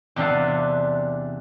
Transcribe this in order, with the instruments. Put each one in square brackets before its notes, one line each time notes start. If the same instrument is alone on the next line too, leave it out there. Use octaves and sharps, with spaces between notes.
[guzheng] E2 C3 D4 D5 F5 F#5